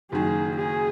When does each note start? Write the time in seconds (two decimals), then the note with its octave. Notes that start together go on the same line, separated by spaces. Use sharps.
0.12 F#1 F#2 D#3 G#4
0.57 G#4